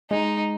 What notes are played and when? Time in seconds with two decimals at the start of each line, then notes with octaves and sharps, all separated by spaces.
0.10 G#3 D#4